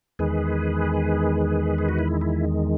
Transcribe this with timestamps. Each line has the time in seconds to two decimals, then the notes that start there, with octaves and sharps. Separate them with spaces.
0.19 E2 D#3 G#3 G#4 B4
1.78 G#4
1.89 F#4
1.99 E4
2.21 E4